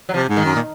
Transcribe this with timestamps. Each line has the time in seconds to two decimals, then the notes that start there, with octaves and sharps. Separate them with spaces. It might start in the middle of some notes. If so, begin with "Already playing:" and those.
0.09 F#3
0.14 C3 F3
0.29 G#2
0.37 D#3
0.45 F#2
0.56 A#2